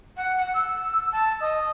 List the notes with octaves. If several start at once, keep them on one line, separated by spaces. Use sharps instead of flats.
F#5
F#5
E6
A5
D#5